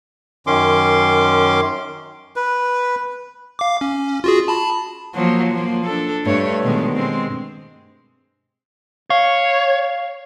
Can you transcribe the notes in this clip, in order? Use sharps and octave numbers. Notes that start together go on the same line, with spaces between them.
F#2 D#3 C#4 C6 D6
B4
F5 D6
C#4
F4 F#4 G#4
A5 B5
F3 F#3 A#3
F3 A#3
D4 A4
G2 A3 C#5
B2 D#3 G#3
G#3 C4
C#5 F5